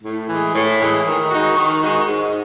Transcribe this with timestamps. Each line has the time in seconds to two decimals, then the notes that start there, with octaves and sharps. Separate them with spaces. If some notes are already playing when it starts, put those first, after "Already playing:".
0.03 A2
0.29 E3
0.34 G#3
0.55 A2
0.80 E3 G#3
1.06 D#3
1.31 G#3 D#4 F#4
1.57 D#3
1.83 G#3 D#4 F#4
2.07 G#2